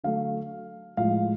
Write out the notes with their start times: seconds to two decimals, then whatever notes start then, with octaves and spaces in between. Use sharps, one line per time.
0.04 D3 F#3 A3 F5
0.97 A2 F3 G#3 F5